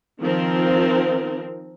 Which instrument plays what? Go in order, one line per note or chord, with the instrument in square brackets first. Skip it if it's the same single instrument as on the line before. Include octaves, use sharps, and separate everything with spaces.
[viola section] D#3 F3 C4 A#4